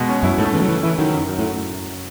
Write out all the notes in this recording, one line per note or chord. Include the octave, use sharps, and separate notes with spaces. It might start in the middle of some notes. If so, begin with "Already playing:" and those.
Already playing: B2 G#3
C#4
F#2 E4
G#2 A3
C#3 E3
F#3
E3 C#4
E3 E4
D#3 F#3
F#2
F#3
A2